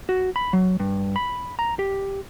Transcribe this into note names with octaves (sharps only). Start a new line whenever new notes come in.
F#4
B5
F#3
G2
B5
A#5
G4